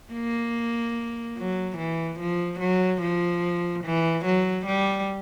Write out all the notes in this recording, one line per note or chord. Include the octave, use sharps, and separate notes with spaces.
A#3
F#3
E3
F3
F#3
F3
E3
F#3
G3